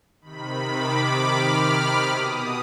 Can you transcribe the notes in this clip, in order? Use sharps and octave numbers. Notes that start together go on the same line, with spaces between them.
C3 D#3 B5
D6
F6
B2 D#6